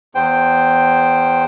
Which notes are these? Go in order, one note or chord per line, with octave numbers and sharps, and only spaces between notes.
E2 C5 G5